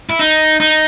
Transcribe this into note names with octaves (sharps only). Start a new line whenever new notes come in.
E4
D#4
D#4